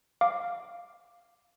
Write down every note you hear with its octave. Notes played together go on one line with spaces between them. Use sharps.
F5 D6